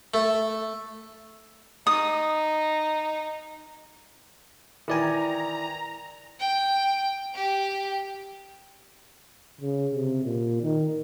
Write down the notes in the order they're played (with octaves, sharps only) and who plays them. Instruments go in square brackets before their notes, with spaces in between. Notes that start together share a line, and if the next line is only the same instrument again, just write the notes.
[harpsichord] A3
[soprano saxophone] D#4 [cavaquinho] D#6
[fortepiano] D#3 E3 G5 [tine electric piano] E4 D5 G#5 [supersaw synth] A#5
[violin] G5
G4
[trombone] C#3
C3
A#2
D#3